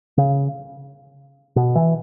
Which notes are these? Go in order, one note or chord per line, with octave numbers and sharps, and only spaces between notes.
C#3
B2
E3